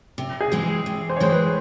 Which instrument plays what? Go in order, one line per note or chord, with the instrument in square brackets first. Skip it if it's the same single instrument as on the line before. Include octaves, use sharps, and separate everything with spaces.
[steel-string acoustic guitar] C3
[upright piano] G#4
[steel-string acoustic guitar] E3 G#3 C4
C3
[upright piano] C5
C#5
[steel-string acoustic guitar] E3 G#3 C4 [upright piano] C5
[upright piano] B4